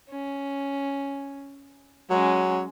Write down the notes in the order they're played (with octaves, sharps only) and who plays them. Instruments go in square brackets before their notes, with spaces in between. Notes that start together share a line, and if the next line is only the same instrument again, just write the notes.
[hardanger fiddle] C#4
[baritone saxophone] F#3 [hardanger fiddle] G#3 C#4